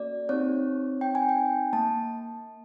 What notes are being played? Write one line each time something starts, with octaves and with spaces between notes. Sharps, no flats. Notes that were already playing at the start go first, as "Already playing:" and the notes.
Already playing: A#3 C#4 F#4 A4 D5
C4 D#4 G4 C#5
G5
G#5
G5
A#3 A5